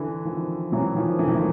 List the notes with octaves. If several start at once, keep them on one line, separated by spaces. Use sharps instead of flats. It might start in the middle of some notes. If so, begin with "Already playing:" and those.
Already playing: D3 E3
D#3 F3
E3 F#3
D#3 F3
D3 E3
D#3
E3